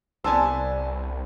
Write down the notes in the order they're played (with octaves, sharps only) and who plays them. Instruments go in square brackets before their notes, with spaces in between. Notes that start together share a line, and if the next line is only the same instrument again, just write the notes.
[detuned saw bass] C2 [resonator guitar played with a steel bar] B3 D4 C5 [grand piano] G#5 A5 E6